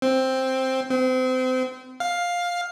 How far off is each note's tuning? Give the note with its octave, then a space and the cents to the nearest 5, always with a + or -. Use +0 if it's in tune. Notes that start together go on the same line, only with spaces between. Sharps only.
C4 +5
C4 -30
F5 +10